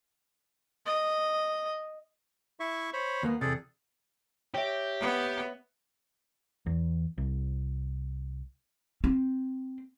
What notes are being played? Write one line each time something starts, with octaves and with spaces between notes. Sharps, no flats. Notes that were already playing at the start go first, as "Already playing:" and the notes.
D#5
E4 E5 C#6
C5 C#5 B5
D#2 A#3 B3
E2 C3 G#4 A4 D5
G4 C#5 E5
B3
E2
C2
C4